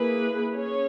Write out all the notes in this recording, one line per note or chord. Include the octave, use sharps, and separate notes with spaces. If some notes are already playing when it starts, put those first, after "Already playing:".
Already playing: A#3 E4 G#4 B4
C#4 G#4 C#5